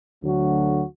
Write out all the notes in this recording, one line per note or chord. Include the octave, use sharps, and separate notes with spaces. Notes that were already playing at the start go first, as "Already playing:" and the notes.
D2 D3 F#3 A3 F#4